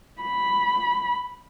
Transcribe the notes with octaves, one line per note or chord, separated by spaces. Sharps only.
B5